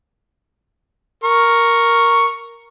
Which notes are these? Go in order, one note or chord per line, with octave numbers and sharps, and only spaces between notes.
A#4 C#6